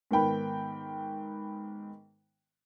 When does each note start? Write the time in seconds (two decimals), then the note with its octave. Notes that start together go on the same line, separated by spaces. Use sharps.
0.11 G#2 D#3 B3 G5 B5